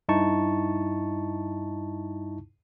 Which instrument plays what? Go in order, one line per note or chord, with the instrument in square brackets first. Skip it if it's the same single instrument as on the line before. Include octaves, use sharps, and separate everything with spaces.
[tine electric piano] G2 D#4 E4 A5 C#6